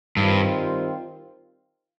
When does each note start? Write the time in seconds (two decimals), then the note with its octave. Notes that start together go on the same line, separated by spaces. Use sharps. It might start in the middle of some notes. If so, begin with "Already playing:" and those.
0.17 G2 D#3 G3 C4 F4